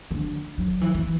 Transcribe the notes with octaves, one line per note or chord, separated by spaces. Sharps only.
D3
F#3
E3
E3